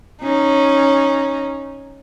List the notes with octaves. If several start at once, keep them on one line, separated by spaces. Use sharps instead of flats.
C#4 D#4